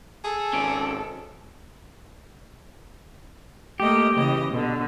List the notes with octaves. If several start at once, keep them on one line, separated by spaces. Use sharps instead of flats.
G#4 A4
G#1 C#4 D5
A3 A#3 G4 D#5
C#3 E3 D#5
B2 D3